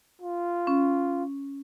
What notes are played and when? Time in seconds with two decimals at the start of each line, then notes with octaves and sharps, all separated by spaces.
0.22 F4
0.67 C#4